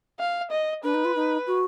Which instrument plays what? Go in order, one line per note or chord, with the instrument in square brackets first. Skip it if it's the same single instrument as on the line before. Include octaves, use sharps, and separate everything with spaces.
[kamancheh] F5
D#5
[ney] D4 [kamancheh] B4
[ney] D#4
F4
D#4
F#4